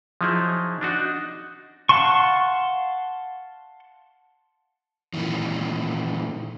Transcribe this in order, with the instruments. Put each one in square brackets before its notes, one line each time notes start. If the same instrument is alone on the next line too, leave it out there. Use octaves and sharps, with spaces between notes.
[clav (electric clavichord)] F3 F#3 D#4 E4 G#4
D4 D#4 F#4
[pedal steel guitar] F5 F#5 A5 C6 C#6
[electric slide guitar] A#2 D#3 E3